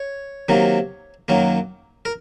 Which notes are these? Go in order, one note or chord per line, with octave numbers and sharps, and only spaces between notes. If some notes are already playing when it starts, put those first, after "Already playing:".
Already playing: C#5
C3 D#3 F#3 A#3
F#2 D#3 F#3 A#3
A#4